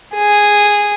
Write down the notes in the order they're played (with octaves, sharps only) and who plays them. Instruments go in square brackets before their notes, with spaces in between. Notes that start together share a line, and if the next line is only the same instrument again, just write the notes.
[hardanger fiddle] G#4